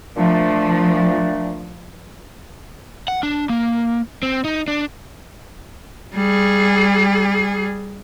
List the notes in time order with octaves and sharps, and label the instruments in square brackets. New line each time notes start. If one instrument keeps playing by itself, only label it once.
[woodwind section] A#2 A3 D4 [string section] F3
[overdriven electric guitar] F#5
D4
A#3
C4
D#4
D4
[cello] G3 G#4